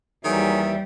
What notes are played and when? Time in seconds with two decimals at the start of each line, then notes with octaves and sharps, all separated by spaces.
0.25 D#2 D#3 E3 F#3 G3 G#4 E5